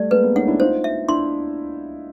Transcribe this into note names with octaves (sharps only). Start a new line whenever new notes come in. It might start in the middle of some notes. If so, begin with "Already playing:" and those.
Already playing: G3 A3 D5
G#3 A#3 B4
A3 B3
C#4 D#4 F#5
D4 E4
D#4 F4 C5
E5
D4 E4 C6